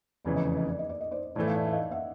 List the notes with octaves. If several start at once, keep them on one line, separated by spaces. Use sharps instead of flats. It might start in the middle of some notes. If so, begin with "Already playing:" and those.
F1 E2 C#3 E3 D5
D#5
D5
D#5
D5
D#5
D5
D#5
C5 D5
A2 E3 A3 C5 D5
F5
D5 E5
E5
D#5 F5
E5 F#5